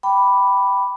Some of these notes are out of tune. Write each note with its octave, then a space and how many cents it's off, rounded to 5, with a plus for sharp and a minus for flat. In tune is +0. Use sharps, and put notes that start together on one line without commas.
G5 -5 B5 +0 D6 +0